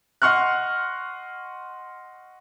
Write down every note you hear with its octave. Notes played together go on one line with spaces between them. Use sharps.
D#5 F#5 C6 C#6 F6 F#6